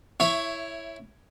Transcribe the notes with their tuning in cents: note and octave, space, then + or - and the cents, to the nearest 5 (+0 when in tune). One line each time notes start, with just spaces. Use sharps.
E4 +0 C#5 +0 E5 +20